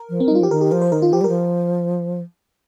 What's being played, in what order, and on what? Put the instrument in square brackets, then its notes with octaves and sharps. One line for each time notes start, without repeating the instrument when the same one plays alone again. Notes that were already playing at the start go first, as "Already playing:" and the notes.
Already playing: [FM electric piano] A#4
[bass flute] F3
[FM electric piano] C4
[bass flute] G3 [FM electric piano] D#4
[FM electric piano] F4
[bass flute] F3 [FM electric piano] G4
[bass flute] D#3 [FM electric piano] A#4
[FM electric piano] G4
[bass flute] F3 [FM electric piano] A#4
[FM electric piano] C5
[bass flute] D#3 [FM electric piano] A#4
[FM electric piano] F4
[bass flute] F3 [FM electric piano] G4
[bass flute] G3
[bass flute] F3 [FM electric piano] A#4